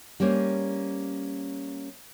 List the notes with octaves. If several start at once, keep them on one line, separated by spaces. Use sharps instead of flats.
G3 A#3 C#4 C5